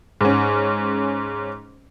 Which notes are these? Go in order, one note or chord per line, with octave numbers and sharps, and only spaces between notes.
G#2 C#4